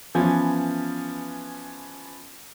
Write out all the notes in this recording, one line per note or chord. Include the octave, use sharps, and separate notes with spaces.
E3 F3 B3 C#4